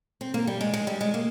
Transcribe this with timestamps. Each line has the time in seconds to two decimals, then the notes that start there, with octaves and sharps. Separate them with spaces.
0.21 C4
0.34 A#3
0.47 G3
0.61 G#3
0.74 G#3
0.87 G3
1.01 G#3
1.14 A#3